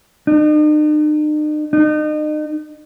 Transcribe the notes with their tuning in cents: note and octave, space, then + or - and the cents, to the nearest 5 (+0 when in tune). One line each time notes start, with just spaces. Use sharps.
D#4 -45
D#4 -35